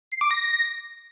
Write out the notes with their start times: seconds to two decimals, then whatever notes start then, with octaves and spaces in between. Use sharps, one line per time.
0.12 C7
0.21 D6
0.31 A#6